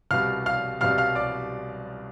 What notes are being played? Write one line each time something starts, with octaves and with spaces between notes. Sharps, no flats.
C2 B2 G3 F5 F6
F5 F6
C2 B2 G3 F5 F6
F5 F6
D5 D6